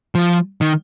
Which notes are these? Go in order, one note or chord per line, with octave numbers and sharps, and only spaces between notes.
F3
D#3